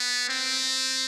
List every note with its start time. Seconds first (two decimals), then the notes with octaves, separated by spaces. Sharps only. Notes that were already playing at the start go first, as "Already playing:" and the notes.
Already playing: B3
0.29 C4